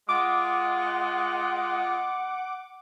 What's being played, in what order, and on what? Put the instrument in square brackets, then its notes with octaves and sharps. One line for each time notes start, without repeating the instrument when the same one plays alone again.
[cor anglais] G#3 [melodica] F4 [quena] F#5 [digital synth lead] D6